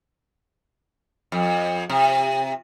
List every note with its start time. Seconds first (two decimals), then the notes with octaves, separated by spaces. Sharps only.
1.32 F2
1.90 C3